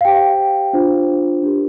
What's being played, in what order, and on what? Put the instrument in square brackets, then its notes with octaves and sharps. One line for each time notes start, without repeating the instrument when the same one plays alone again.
[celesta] F5
G4 C5 G5
D4 F4 C5
D4 G4 A#4